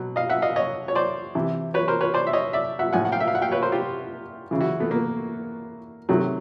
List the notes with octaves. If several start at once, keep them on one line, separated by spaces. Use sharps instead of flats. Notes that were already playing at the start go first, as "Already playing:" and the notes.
Already playing: B2 F#3
D#5 F5
E5 F#5
D#5 F5
C#5 D#5
C#5
C5 D5
C3 E3
B4 C#5
A#4 C5
B4 C#5
C5 D5
E5
C#5 D#5
D5 E5
E5 F#5
A2 F3 F#5 G#5
F#5
F5 G5
E5
F5
F#5
F5 G5
B4 C#5
A#4 C5
F4 G4
C#3 E3
E4 F#4
A3 B3
A#3
C3 D#3 F#3 A3